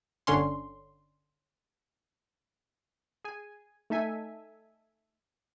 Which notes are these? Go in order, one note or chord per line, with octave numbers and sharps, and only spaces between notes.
G1 D3 C#4 C6
G#4 G#5
A3 D#4 A4 E5 G#5